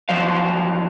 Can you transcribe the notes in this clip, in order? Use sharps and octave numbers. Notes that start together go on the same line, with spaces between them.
E2 F3 F#3 C5 F5